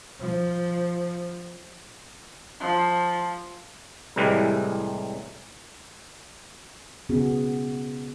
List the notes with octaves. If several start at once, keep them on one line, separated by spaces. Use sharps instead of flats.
F3
F3
C2 A2 E3 G3 G#3
C#3 B3 C#4 F#4 G#4